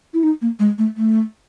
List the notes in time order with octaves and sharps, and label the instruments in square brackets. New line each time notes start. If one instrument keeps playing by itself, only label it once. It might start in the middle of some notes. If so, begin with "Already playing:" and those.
[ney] E4
D#4
A#3
G#3
A3
A3